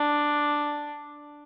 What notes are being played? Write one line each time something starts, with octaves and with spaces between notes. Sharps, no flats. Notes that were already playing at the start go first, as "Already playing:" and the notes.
Already playing: D4